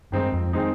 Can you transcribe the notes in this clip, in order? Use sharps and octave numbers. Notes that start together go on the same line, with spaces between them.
G2 D#3 G#3 C4 D#4
F2
D#3 G#3 C4 D#4